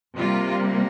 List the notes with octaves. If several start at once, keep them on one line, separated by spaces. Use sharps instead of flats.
C3 G3 A#3 F4